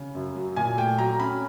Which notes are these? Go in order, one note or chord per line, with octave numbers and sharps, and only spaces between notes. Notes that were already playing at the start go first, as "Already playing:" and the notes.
Already playing: C#3
F#2
F#3
A#2 G#5
A3 G5
F#3 A#5
C#4 B5